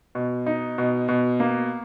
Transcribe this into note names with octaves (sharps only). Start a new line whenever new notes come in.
B2
D#4
B2
B2
A#3